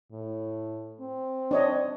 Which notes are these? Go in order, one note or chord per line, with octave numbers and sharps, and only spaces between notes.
A2
C4
D4 C#5 D#5